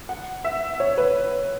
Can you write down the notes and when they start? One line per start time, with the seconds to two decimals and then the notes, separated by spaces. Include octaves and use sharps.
0.09 F#5
0.45 E5
0.80 C#5
0.98 B4